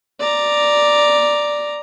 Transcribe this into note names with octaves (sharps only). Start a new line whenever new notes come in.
D5 A#5